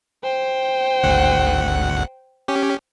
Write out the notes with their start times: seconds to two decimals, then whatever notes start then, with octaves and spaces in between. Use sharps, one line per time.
0.24 C5 G5
1.03 G#1 D2 F#5
2.48 C#4 G4